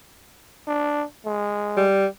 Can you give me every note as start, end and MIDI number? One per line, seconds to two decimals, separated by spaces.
0.68 1.03 62
1.26 1.84 56
1.77 2.06 55